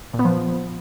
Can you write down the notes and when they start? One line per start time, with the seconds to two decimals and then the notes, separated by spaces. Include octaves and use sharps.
0.13 A#2
0.19 B3
0.25 F3